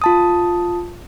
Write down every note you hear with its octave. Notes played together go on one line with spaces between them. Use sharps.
F4 A5 D#6